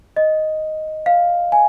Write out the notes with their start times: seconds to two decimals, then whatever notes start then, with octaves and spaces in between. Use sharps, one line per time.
0.16 D#5
1.06 F5
1.52 G#5